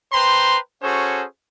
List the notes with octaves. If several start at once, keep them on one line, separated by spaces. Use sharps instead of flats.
B4 C5 G5 A#5 C6
C#4 F#4 G#4 A4 C5 C#5